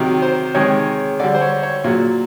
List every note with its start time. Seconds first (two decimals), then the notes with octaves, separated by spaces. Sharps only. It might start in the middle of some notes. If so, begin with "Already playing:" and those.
Already playing: C3 D#3 F#3
0.22 C5
0.55 C3 D#3 G#3 C#5
1.19 D3 G3 D5
1.35 C5
1.41 C#5
1.63 C#5
1.84 A#2 F#3